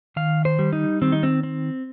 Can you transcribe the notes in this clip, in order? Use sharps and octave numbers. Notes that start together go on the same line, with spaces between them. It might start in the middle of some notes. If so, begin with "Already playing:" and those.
D#3 F5
C5
G3
D#4
D#3 C4
D#4
C4
C4